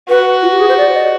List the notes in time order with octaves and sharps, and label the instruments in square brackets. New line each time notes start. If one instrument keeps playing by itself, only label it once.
[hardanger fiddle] F#4 [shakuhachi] B4
[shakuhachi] F4
G4
G#4
C5
D5
D#5